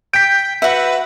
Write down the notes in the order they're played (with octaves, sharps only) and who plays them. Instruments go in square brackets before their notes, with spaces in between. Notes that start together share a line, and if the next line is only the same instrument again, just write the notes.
[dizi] G5 [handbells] G6 B6 [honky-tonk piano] D7
[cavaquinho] F#4 F#5 [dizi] B4 [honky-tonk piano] E5